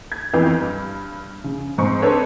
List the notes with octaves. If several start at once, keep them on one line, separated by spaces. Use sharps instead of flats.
G#6
F2 E3 B3 G6
G2
C#3
G#2 G#3 C4 C#6
C4 D4 A4 B4 C#5